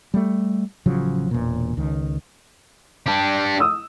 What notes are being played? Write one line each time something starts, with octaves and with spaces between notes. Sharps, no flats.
G3 A3
A1 C#3 F3 F#3
E1 A#2
C#2 D#3
D4 G4
D#6 E6